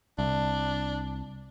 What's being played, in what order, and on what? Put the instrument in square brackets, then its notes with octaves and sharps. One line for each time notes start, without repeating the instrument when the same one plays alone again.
[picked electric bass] C2 [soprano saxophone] D4